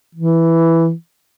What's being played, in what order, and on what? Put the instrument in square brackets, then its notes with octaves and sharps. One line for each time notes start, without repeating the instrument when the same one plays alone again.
[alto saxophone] E3